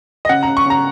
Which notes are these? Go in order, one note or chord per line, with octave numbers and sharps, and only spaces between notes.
D#5
C#3 F#5
C#3 A#5
C#6
C#3 A#5